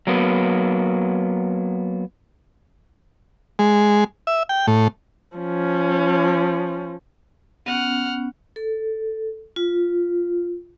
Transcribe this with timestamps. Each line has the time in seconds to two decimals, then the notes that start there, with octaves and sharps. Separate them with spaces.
0.07 F#3 A#3 B3
3.59 G#3
4.27 E5
4.49 G5
4.67 A2
5.37 F3 C#4
7.66 B3 C#4 F#5 F6
8.56 A4
9.56 F4